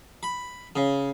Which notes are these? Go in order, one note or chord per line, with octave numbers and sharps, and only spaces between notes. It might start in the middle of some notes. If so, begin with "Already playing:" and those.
B5
C#3